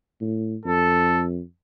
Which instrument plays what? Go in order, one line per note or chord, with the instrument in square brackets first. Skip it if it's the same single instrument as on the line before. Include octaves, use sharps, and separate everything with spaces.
[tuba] A2
[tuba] F2 [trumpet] A4